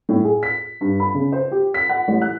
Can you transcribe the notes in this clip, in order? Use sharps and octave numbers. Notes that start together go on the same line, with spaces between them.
A2
G#4
B6
G2
B5
C#3
C5
G4
B6
F#5
A1
F#6